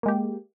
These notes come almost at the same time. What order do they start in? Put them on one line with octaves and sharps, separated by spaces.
A#3 G#3 G4